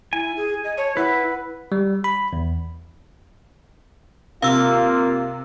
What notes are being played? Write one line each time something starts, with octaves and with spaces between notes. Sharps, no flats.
E4 G#5
G#4
D#5
C#5 A5
E4 B4 F#5
G3
B5
E2
C3 A#3 F4 F5 E6